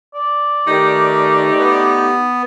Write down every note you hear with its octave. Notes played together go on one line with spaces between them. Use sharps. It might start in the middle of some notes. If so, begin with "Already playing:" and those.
D5
D#3 A3 D#4 G4
B3